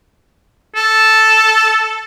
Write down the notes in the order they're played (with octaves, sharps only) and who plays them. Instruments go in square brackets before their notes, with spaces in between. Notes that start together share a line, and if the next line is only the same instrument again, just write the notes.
[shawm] A4